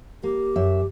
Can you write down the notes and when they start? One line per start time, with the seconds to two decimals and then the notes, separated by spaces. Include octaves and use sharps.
0.23 A#3 G4
0.56 F#2 E5